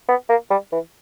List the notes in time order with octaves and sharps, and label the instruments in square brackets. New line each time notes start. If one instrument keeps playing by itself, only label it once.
[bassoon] B3
A#3
G3
E3